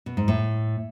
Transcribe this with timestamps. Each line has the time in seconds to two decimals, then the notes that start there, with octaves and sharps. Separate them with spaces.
0.06 B2
0.17 G#2
0.28 A2